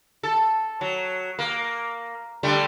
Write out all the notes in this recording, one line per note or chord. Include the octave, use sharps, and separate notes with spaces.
A4
F#3
A#3
D3 G3 A3